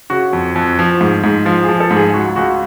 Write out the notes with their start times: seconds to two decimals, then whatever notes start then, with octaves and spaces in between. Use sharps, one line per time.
0.10 C#3 F#4
0.33 F2
0.55 F2
0.79 F3
1.01 G#2
1.24 G#2
1.45 F3 F4
1.64 G#4
1.69 F3
1.80 A4
1.91 G#2
1.97 G#4
2.14 C#2 F#4
2.36 C#2 F#4